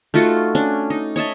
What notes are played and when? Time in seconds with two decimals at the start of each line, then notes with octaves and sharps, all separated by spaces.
0.14 A3 D#4 F4 F#4
0.55 C#4 D4
0.90 D#4
1.16 C#5 D#5 E5 A5